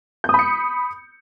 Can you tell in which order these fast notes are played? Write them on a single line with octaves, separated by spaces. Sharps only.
G6 D#6 B5 C#7